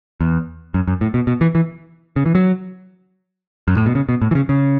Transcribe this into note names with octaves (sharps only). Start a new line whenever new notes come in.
E2
F#2
F#2
A2
B2
B2
E3
E3
C#3
E3
F#3
F#2
A2
B2
C#3
B2
A2
E3
C#3
C#3